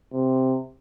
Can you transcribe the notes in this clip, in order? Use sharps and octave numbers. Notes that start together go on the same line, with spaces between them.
C3